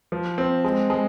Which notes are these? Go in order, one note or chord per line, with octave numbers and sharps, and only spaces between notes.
F3
C4
G#3
G#3